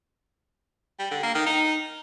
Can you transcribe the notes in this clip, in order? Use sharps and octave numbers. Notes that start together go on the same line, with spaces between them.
G3
D3
A#3
D#3
D#4